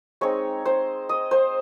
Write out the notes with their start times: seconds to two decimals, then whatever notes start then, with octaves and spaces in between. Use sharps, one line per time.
0.21 G#3 C4 D#4 C#5
0.65 C5
1.09 D#5
1.31 C5